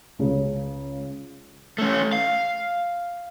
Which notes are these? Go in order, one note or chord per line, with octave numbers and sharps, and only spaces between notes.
C#2 C#3
A3 C#4
F5